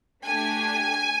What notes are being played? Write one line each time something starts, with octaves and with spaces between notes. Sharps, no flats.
A3 D4 G4 G#5